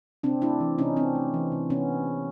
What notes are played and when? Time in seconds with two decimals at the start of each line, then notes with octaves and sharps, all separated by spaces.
0.23 C3 C4 D4
0.42 A3 D4 E4
0.60 E3
0.78 C3 C#4 D#4
0.96 C3 C4 D4
1.15 A3
1.34 E3
1.52 C3
1.70 C3 B3 C#4